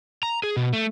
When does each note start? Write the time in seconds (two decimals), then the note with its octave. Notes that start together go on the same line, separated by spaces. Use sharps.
0.23 A#5
0.44 G#4
0.57 B2
0.73 A3